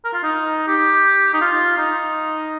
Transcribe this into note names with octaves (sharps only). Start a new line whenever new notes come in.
A#4
F4
D#4
G4
D#4
F4
D#4